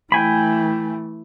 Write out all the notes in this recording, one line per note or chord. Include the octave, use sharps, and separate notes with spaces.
E3 A3 G5 G#5 B5